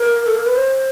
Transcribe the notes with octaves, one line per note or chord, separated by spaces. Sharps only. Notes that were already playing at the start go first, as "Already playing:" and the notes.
Already playing: A#4
A4
A#4
B4
C5